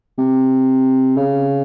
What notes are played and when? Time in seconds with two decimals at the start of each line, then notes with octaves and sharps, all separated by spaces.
0.18 C3
1.17 C#3